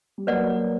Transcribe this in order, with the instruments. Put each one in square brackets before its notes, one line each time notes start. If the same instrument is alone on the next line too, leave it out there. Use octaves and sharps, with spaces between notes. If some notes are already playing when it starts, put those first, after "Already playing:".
[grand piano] G3
[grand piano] F#3 A#3 [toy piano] B4 D5 F#5